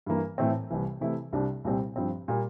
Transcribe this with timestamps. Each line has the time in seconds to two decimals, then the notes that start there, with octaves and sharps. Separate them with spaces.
0.06 G2 E3 A#3
0.38 A2 E3 A3 C4
0.71 C2 C3 E3
1.01 C3 E3 A3 E4
1.33 C2 C3 G3 D4
1.64 C2 A#2 G3 C4
1.96 G2 F3 C4
2.28 A#2 G3 A#3